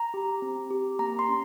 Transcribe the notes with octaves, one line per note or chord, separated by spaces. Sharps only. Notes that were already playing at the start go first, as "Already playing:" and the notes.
Already playing: A#5
G4
C4
G4
A#3 A#5
C6
C#4